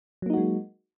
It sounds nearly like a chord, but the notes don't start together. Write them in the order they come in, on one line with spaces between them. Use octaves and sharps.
F#3 A#3 D#4 F#4 G#3